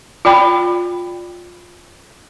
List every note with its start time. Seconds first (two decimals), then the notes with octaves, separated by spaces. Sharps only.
0.25 F4 D5 G5 B5